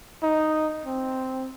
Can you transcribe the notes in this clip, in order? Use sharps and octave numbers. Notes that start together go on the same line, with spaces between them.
D#4
C4